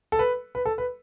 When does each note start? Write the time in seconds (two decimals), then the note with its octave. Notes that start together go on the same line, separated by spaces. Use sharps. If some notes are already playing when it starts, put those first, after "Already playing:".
0.12 A4
0.19 B4
0.55 B4
0.65 A4
0.78 B4